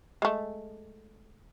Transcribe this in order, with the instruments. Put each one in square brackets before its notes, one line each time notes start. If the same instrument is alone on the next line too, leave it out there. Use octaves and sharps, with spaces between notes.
[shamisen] G#3 A3